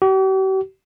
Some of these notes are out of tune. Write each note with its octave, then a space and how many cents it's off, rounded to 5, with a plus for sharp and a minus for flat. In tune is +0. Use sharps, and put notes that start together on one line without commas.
G4 -45